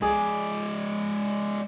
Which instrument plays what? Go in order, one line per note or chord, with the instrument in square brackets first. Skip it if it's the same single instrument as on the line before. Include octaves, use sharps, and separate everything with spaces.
[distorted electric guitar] G#3 D5 [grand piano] G#4